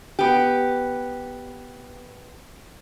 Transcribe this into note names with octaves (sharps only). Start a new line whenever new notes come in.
B3 G4